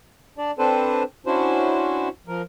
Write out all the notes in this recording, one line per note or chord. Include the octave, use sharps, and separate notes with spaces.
D4 D5
C4 D4 A4 B4 C5
C#4 D4 E4 F#4 C5
F3 A#4